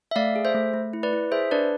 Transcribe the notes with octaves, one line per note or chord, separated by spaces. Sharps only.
E5
A3 D5 F5
G#4
C5 E5
A3
A3
E4
B4 D5
E4
G#4 C5 E5
D4 B4 D5